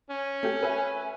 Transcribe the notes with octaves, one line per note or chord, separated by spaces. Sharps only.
C#4
A3 G4
B4 E5 G#5